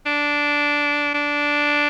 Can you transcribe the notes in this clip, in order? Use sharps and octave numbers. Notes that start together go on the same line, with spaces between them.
D4
D4